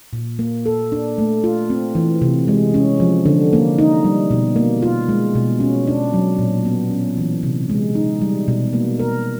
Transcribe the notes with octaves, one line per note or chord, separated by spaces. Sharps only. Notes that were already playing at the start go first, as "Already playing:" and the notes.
A#2
A#3
A4
D4
A3
F4
C4
E3
C3
G#3
C#4
F3
D3
A#3
D#4
G3
B2
A#3
F4
G#3
B2
C#4
D4
F#3
A#2
B3
C#4
E3
C3
G#3
D#4
G3
B2
A#3
A#4